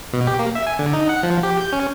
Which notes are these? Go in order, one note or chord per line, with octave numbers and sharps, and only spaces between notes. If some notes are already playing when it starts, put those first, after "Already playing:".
B2
G4
A#3
E5
G#5
D3
D#4
F#5
F3
G4
G6
C#4